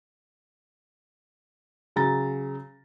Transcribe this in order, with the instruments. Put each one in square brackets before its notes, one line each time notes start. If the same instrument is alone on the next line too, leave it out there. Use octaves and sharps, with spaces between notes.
[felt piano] C#3 F#3 A#5 A6